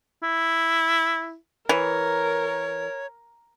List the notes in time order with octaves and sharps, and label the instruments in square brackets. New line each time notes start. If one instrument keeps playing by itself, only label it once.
[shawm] E4
[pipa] E3 [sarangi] A#4 [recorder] C#5